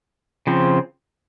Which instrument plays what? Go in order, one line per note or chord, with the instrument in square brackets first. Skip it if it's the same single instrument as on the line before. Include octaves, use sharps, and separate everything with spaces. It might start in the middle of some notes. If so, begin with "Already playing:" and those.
[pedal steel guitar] C#3 F3 C4